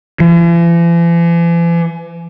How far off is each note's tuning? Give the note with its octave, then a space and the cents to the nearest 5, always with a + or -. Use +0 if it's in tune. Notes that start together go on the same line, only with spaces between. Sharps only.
E3 +45